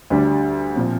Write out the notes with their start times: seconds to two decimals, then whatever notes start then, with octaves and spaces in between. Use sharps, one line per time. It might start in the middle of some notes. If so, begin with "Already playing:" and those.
0.10 D2 D3 G3 D4
0.76 A#2 F3 C4